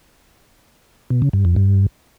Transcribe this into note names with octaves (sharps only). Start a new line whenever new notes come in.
B2
C#3
G2
F2
G2